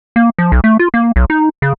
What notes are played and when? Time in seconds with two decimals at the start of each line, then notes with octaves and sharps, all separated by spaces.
0.16 A#3
0.38 F3
0.52 B1
0.64 A3
0.79 F4
0.94 A#3
1.16 B1
1.30 D#4
1.62 C#3